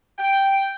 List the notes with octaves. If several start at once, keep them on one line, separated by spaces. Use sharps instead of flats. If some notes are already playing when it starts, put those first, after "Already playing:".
G5